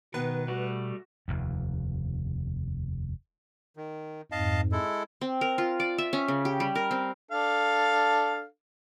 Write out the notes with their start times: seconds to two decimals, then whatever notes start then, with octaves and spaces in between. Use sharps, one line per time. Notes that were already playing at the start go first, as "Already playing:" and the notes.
0.14 B2 D#3 B3 B4
0.48 G3 A3 F#4
1.28 F1 D#2
3.77 D#3
4.32 F2 G#2 D#5 F5 A5
4.72 G#3 E4 A4
5.21 C4
5.41 A#4
5.58 F4
5.80 D5
5.98 E5
6.13 C#4
6.28 C#3
6.45 G4
6.60 G3
6.75 A#4
6.91 C4
7.31 D4 A4 F5